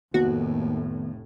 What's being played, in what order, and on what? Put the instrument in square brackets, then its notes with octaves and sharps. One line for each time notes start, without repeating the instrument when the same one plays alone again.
[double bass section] F1 A2 [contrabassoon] D#2 [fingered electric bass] D#3 B3 [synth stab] F#4